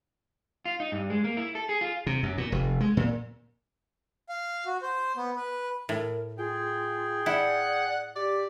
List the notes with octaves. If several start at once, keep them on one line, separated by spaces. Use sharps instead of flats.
F4
D#4
G2
G#3
A#3
E4
A4
G#4
F4
C3
F#2
A#2
F1
G#3
A#2
F5
F#4
C5
B3
B4
A2 A#4
F4 G#4 G5
E4 D5 F#5
G4 D5